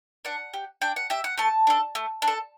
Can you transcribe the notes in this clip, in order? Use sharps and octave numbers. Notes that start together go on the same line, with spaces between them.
D4 F#5
G4
D4 G5
F#5
G4 E5
F#5
A3 A5
D4 A4
A3
D4
A4